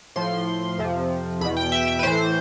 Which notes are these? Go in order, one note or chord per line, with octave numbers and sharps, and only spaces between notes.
A2 F3 C6
F2 C3 F3
E2 B2 B5
G5
E5
E5
B4
A2 E3 C5